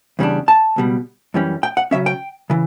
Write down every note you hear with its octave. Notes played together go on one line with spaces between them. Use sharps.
E2 C#3 G3 D4
A5
C#2 B2 G3
F#2 E3 G3 C#4
G5
F#5
C#3 F#3 C#4 E5
G5
C#3 E3